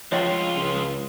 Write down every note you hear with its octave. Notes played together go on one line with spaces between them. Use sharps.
F3 G#3 F4 F#4 C#5 D#5 G5
C#2